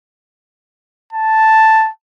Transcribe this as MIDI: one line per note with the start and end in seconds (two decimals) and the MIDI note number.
1.13 1.89 81